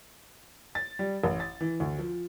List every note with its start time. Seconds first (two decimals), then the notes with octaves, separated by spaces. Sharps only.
0.75 A6
0.99 G3
1.24 A1
1.40 A6
1.61 E3
1.80 D2
1.98 F3